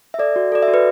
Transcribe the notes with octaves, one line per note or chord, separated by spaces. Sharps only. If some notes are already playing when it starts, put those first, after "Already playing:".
E5
A4 D5
F#4
A4 D5
E5
F#4
B4